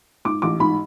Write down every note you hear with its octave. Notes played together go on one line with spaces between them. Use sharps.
G#2 D6
A1 D6
G#2 B5